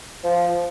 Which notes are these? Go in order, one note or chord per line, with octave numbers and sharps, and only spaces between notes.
F3